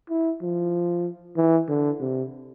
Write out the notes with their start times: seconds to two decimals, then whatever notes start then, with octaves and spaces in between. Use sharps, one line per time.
0.10 E4
0.42 F3
1.37 E3
1.69 D3
2.00 C3